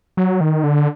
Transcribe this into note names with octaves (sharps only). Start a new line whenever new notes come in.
F#3
D#3
D3